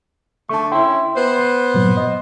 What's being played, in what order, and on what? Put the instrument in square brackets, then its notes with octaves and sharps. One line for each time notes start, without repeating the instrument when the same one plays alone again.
[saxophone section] D3 A3 [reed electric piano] A5 C#6
[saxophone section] D3 C#4 E4 [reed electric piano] E5 G5 C6
[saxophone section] B3 C5
[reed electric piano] G2 A#2 F#3
D#5